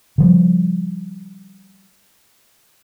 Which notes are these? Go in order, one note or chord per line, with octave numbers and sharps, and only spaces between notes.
C#3 F3 G3